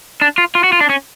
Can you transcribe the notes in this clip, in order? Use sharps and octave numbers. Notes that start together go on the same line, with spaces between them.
D4
F4
F4
F#4
F4
D4
C#4